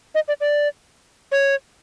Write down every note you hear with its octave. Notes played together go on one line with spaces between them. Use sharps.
D#5
D5
D5
C#5